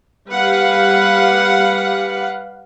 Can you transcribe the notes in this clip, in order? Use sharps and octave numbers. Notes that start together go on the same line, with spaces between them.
G3 B4 F5 F#5